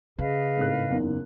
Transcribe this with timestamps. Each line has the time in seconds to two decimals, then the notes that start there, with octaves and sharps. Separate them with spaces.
0.19 C#3 G#4 B4 D#5 F5
0.57 G#1 A2 F#6
0.90 F#1 E2 D#4